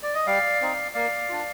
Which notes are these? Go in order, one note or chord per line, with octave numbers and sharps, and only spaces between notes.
D5
D#5
G3 D5 F5
C4 D#4
A#3 D5 F5
D4 F4